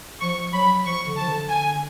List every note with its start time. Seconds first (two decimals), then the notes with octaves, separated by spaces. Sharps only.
0.21 F3 C#6
0.52 F#3 B5
0.85 F3 C#6
1.06 D3
1.17 F3 A5
1.28 D3
1.49 G#5